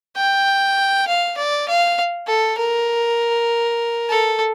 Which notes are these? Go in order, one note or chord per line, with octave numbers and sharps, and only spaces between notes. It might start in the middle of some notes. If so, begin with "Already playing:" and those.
G5
F5
D5
F5
A4
A#4
A4